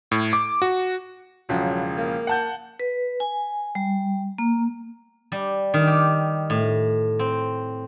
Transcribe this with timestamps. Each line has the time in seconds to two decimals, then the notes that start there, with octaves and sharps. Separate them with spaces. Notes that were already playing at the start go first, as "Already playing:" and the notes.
0.12 A2
0.33 D6
0.62 F#4
1.49 E1 C#3 F3 F#3
1.97 A#3
2.27 F#5 A5 G6
2.80 B4
3.20 G#5
3.75 G3
4.38 A#3
5.32 G3
5.74 D#3
5.87 G4
6.50 A2
7.19 C4